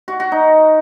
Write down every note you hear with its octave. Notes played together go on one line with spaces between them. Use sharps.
F#4
F#4
D#4